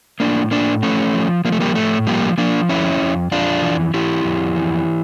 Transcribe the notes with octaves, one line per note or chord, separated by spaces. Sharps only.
A2 A#3 D4
A2 A#3 D4
F3 A3 C#4
F3
F3 A#3
A3
G3 A#3
A2 A3
F3 G3 A#3
F3 A#3 D4
F2 C#4 E4
F2
F2 D4 F4
E3
E3 E4 G4
F2
E3